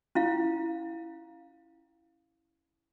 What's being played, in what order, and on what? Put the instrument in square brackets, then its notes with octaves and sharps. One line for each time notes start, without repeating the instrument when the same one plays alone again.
[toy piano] C#4 E4 F5